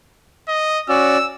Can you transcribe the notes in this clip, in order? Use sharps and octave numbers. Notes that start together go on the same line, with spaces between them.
D#5
C#4 F#4 D5 E6